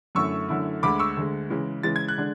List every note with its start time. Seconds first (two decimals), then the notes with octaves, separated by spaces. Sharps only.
0.15 F#2 D3 A3 E4 C#6 E6
0.49 F#2 D3 A3 E4
0.83 D2 D3 G#3 B5 D6
0.99 C#6 E6
1.17 D2 D3 G#3
1.50 C#3 E3 G#3
1.83 C#3 E3 G#3 A6
1.96 G#6
2.08 F#6
2.18 D3 G#3 D4